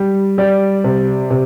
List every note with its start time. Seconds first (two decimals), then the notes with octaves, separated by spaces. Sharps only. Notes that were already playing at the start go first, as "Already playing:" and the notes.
Already playing: G3
0.38 G3 D5
0.84 C3
1.30 C3